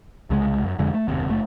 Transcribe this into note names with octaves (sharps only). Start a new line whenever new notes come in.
C2 C#3 G3 G#3
F#2
E1 F2 D3 G#3
A3
F#1 D#2 C3
F#1 A3